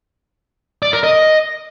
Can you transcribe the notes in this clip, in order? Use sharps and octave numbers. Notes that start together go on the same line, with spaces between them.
D5
A#4
D#5